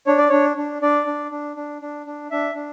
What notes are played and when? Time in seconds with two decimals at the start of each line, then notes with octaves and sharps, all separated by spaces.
0.07 D4 C#5
0.18 D5
0.29 D4 C#5
0.57 D4
0.82 D4 D5
1.07 D4
1.31 D4
1.56 D4
1.82 D4
2.06 D4
2.31 D4 E5
2.55 D4